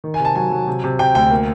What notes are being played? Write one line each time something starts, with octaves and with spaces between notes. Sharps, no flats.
D#3
G#5
C3
A5
F#3 G#5
F#3
C3
C3
C3 G5
D2 G5
A#3